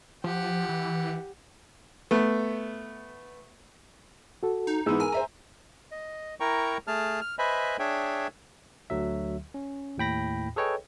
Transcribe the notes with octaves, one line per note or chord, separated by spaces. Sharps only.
F3 G4 F#5
E3
A3 B3
F#4 A4
D#4
G#2 E3 B3 G#4 E6
A#4 G#5
C5 E5 A#5
D#5
E4 A#4 G5 A#5 C#6
A3 G#4 A5 F6
F6
B4 C5 D#5 E5 G#5 B5
D4 G#4 C#5 E5 G5
D2 D3 F#3 E5
C#4
D#2 A2 G5 B5 A#6
G#4 A4 B4 C#5 D#5 G5